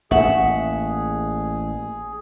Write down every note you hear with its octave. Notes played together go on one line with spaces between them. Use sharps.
A1 A#3 G#4 E5 F#5 C#6